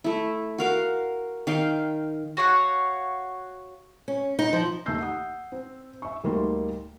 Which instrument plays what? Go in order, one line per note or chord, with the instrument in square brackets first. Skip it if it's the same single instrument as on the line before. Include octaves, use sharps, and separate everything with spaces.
[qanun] A3 E4
F#4 A#4 F5
D#3 F5 G5
[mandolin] F#4 C#5 F5 F#5
[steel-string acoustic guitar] C#4
D#4
F3
[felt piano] D#2 A3 D#4 E6 G6 C7
F#5 D#6
C4
E5 C#6
D2 G3 A#3 D#4 C6